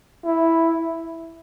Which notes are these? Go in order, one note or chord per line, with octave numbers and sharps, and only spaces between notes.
E4